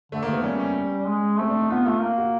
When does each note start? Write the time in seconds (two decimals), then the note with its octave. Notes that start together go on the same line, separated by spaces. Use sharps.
0.12 D3 A3
0.23 A#3
0.27 D#3
0.33 B3
0.44 G3 C#4
0.60 C#4
1.06 G#3
1.39 A3 C4
1.49 D4
1.60 D#4
1.70 B3 F4
1.86 A3 F4
2.01 A#3
2.18 F#4